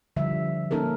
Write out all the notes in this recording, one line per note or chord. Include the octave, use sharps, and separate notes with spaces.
D3 F3 G3 E5
A#3 C#4 D#4 A4 A#4